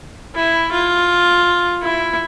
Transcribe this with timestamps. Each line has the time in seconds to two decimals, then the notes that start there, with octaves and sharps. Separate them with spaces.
0.35 E4
0.71 F4
1.82 E4